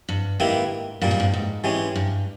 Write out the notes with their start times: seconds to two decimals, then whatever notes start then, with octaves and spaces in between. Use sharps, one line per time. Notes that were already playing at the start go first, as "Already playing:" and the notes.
0.09 G2
0.40 G#2 D#3 A#3 E4 G4 B4
1.01 G2 A#2 G3 A#3
1.11 G#2
1.20 G2
1.33 G#2
1.64 E3 G#3 C#4 G4
1.96 G2